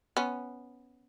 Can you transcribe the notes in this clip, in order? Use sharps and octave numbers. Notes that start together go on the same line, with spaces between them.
B3 C#4